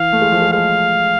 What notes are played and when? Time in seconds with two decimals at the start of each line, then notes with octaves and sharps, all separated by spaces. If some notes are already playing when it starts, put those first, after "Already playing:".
Already playing: E3 F5
0.13 A3
0.22 G#3
0.32 F3
0.42 G#3
0.53 G#3 F5